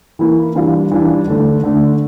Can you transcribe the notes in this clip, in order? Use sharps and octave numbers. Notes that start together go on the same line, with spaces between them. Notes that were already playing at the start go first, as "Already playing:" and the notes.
E3 A#3 E4
E3 G3 D4 F4
E3 G3 D4 F4
D3 A3 D4
D3 A3 D4